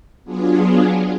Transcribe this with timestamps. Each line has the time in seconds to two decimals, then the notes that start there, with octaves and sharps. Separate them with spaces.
0.24 F#3 B3 D4 F4 G#4